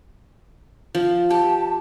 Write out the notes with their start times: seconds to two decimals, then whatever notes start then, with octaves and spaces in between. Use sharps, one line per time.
0.95 F3
1.30 G4 A5